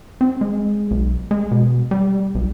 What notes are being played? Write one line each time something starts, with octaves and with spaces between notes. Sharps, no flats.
C4
G#3
B1
G#3
B2
G3
B1